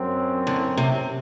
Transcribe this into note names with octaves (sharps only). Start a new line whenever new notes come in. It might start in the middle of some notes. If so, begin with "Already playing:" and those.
Already playing: F#2 F#3 C4
D3
C3